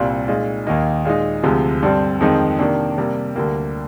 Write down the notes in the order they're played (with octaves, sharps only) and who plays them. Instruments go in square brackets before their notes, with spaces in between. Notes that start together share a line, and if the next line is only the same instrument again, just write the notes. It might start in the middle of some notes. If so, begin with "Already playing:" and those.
Already playing: [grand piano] C2 A#2 G3 C4
A#2 G#3 D#4
D#2 D#3 A#3 D#4
A#2 G#3 D#4
D2 C3 F3 G#3
G2 D3 G3 C4
F2 D#3 G#3 C4 D#4
C3 D#3 A#3 D4
C3 G3 A#3
D2 D3 G3 A#3